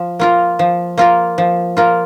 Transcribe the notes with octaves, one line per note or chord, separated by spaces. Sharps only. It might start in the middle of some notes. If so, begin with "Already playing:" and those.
Already playing: F3
A#3 F4 A#4
F3
A#3 F4 A#4
F3
A#3 F4 A#4